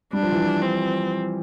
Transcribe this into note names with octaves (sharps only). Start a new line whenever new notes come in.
G3 D4
F3
E3
F3
C4